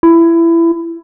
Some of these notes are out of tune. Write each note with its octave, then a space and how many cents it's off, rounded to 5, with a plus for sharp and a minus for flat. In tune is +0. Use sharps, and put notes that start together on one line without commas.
E4 +20